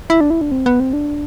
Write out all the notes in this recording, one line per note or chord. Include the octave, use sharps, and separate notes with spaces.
E4
D4
E4
D4
C4
B3
C4
D4